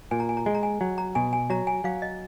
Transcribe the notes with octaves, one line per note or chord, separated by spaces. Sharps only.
A#2 G#5
A#5
G#5
A#5
G#3 G#5
A#5
G#5
F#3
A#5
B2 G#5
G#5
F#3 A#5
G#5
F#3 F5
D#5